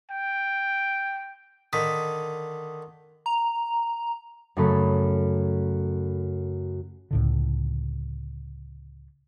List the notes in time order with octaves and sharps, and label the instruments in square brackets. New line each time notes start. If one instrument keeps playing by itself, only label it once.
[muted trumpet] G5
[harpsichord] D3 D#3 [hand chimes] D#6 B6
[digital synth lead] A#5
[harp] F#2 C#3 A3 B5
[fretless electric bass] C#2 A2 D3